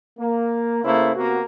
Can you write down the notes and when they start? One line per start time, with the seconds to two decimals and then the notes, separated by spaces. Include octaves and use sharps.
0.19 A#3
0.84 C#3 A3 A#3 E4 B4 C5
1.15 C3 A#3 B3 F#4